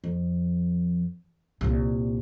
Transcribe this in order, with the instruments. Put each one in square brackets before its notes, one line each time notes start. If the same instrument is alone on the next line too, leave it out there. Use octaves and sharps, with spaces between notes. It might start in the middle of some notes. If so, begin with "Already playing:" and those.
[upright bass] F2
C2 A#2